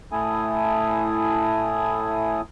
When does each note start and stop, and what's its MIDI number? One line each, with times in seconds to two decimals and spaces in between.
0.12 2.41 45
0.12 2.41 57
0.12 2.41 64
0.12 2.41 69
0.12 2.41 80
0.12 2.41 87